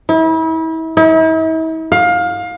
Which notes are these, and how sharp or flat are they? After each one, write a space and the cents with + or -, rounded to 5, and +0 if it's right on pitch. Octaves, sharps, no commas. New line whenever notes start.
E4 -35
E4 -45
F5 +25